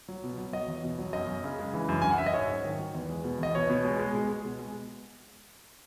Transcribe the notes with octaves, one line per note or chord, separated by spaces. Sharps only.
F#3
B2
F#3
F#3 D#5
E2
B2
F#3
F#2 D#5
F#2
C#3
G#3
E3
F#2
F#2 G#5
F#5
F#2 E5
D#5
G#2 C#5
G#2
D#3
F#3
E2
G#3
B2
E2 D#5
B2 C#5
B2
G#3
G#3
G#3
G#3
B2
G#3